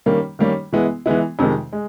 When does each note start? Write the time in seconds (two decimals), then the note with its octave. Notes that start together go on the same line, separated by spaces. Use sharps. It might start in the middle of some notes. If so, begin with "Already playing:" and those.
0.06 D#3 G3 A#3 C#4
0.39 D#3 G3 A#3 C#4
0.73 E3 G#3 B3 E4
1.06 E3 G#3 B3 E4
1.39 F2 C3 D#3 G#3
1.73 G#3